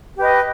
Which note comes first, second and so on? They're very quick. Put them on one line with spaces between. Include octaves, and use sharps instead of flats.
G4 B4 D#5